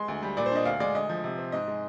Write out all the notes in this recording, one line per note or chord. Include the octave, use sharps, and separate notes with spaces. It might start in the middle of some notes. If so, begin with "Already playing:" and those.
Already playing: G#3 C6
D2
G3
A#2 D5
C5
D4 D#5
D2 F5
G#3 D5
D2 D#5
F3
C3
C4
G#2 D#5
G#3